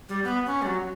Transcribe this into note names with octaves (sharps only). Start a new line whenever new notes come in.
G3
B3
C#4
G3
F#3